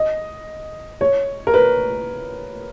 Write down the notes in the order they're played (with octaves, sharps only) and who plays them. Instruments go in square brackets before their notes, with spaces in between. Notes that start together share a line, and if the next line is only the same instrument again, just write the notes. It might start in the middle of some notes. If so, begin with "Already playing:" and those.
Already playing: [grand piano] D#5
C#5
A#4
B4